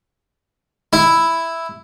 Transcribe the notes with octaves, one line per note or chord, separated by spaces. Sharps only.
E4